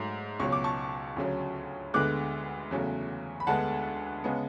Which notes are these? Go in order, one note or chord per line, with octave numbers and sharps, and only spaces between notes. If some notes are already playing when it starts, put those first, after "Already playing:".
Already playing: G#2 F#3 A3
C#2 B2 F#3 C#6
D6
A5 C#6
D2 C#3 F#3
D2 D3 G#3 B3 D6 F#6
E2 C#3 F#3 A3
B5
D2 D3 G#3 B3 F#5 A5
C#3 G#3 B3